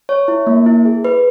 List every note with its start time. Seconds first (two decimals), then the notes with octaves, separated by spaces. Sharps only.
0.09 C#5
0.28 E4
0.47 A#3
0.66 E4
0.85 G#4
1.05 B4